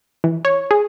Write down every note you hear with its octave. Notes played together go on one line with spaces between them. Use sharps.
E3
C#5
G#4